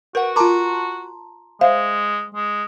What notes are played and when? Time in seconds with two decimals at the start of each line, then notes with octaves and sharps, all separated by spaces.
0.15 F#4 A#4 B4 F#5
0.36 F4 A#4 A5 A#5 C6 D6
1.61 G#3 C5 E5 F5
2.34 G#3